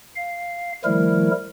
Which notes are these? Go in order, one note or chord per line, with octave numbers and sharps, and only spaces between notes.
F5
D#3 F3 G3 A3 E4 A#4